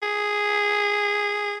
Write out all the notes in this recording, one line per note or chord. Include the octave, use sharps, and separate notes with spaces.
G#4